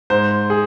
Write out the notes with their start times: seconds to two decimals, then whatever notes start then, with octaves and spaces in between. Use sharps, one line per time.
0.10 G#2 C5
0.50 G#4